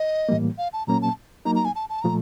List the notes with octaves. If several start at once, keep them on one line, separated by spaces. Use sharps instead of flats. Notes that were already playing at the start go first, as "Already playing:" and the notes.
Already playing: D#5
A2 E3 G3 A#3
F5
A5
A#2 F#3 A#3 C#4 A#5
A5
F#3 A#3 D#4 A#5
A#5
G#5
A5
A5
A#2 F3 A3 A#5